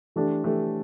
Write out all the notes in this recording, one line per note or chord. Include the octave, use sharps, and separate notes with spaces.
E3 A3 D4 G4
E3 A3 D4 G4